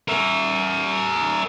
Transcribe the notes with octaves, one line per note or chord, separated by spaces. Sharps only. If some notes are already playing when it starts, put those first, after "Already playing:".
A#4 E5